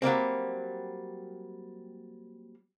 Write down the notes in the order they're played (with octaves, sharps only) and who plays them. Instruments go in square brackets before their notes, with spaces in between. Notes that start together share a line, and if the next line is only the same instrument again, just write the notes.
[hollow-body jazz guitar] F#3 G3 A#3 C4